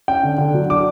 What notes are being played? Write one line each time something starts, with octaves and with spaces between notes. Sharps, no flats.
C#4 G5
D3
D3
F#3
D4 D6